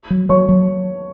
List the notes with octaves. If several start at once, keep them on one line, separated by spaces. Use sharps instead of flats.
F#3
F#3 C#5 C#6
F#3